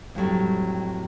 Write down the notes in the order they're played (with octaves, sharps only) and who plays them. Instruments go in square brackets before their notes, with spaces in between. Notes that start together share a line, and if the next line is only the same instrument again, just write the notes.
[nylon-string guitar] F2 A2 F#3 G3